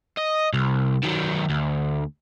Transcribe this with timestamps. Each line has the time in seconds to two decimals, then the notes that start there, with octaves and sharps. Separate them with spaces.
0.18 D#5
0.53 C2
1.03 D#3 F#3
1.50 D2